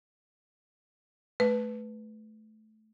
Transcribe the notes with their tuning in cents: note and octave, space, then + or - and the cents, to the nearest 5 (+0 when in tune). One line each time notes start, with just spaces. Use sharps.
A3 -20 B4 +0